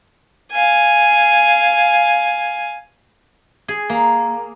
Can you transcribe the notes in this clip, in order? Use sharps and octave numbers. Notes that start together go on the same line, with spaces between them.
F5 G#5
G#4
A#3